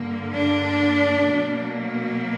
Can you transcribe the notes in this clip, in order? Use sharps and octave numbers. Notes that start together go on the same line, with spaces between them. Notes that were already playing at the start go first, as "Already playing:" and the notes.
Already playing: G2 D3 A#3
D4
B2 F#3 A#3